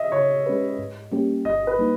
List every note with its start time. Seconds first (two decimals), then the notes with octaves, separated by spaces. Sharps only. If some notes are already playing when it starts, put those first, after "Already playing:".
Already playing: D#5 E5
0.12 C#3 C#5
0.46 G#3 C#4 G4 B4
0.79 G#2
1.12 G3 A#3 C#4 G4
1.45 G1 D#5
1.67 B4
1.79 G3 A#3 D#4